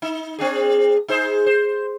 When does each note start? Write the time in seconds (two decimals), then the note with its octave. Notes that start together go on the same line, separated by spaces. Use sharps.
0.02 D#4
0.39 C4 D4 G#4
1.08 D#4 G#4 C5
1.46 C5